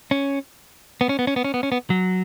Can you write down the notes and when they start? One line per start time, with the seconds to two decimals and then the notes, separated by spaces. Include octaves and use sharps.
0.11 C#4
1.01 B3
1.09 C#4
1.19 B3
1.27 C#4
1.36 B3
1.44 C#4
1.54 B3
1.63 C#4
1.72 B3
1.90 F#3